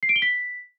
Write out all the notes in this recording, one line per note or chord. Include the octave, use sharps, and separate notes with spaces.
C7
D7
G7
B6